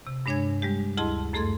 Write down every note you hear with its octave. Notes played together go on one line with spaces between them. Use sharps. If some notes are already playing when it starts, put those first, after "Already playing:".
C3
G2 G#3 D4 C#5 G#5 G#6
G3 G#3 G4
D2 E4 G#4 D#5 A5 C6
F#2 A3 G#4 A4 C6 G#6